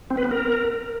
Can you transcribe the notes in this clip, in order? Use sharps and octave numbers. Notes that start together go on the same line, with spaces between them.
C4
B4
B3
A#4